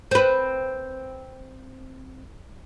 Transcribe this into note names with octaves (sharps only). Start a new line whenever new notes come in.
C4 B4